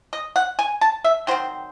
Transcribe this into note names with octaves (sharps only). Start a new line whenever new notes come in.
D#5
F#5
G#5
A5
E5
D#3 F#3 C4 C5